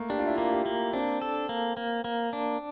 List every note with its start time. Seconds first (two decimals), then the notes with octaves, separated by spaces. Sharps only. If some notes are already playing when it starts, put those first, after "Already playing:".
Already playing: A3 A#3
0.09 D4 G4
0.19 F4
0.27 E4
0.35 F4
0.38 A#3
0.52 G4
0.66 A#3
0.93 C4 D4
1.22 A4
1.49 A#3
1.77 A#3
2.04 A#3
2.33 D4